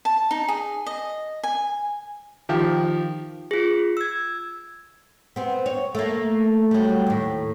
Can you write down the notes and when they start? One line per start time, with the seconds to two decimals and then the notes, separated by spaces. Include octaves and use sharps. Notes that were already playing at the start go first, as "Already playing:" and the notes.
0.05 A5
0.31 D#4
0.48 G#4
0.86 D#5
1.43 G#5
2.49 D#3 F3 G4
3.51 F4 G#4
3.97 E6 G#6
5.36 B3 C4
5.66 C#5
5.95 A3 A#3
6.71 F#3 G3
7.07 D#2 A2